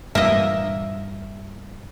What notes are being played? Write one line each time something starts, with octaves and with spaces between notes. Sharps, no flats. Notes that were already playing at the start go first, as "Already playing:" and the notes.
G2 A#2 E3 A#3 D#5 E5